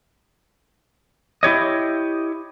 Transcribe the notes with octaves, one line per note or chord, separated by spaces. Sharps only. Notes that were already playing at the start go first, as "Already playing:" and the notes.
E4 G4 C#5 D#5